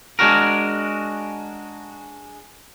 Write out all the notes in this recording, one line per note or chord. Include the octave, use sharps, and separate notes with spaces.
G#3 D4 F#4 A#4